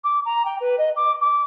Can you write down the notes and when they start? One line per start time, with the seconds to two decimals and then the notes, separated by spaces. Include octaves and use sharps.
0.04 D6
0.25 A#5
0.45 G5
0.60 B4
0.78 D#5
0.96 D6
1.21 D6